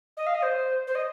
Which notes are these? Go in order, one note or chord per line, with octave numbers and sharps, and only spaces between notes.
D#5
F5
D#5
C5
C5
D#5